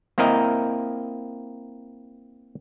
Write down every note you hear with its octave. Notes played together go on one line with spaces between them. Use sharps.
A#3 C4 E4 A#4 D#5 A#5